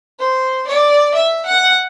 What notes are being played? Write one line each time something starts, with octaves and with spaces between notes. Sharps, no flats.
C5
D5
E5
F#5